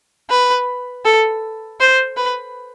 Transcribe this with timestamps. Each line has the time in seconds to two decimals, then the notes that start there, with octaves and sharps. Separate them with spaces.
0.31 B4
1.05 A4
1.81 C5
2.17 B4